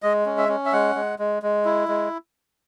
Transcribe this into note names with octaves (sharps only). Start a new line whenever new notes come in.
G#3 D#5
C#4
E5
C#4
E5
G#3 F#5
G#3
G#3
G#3
E4
G#3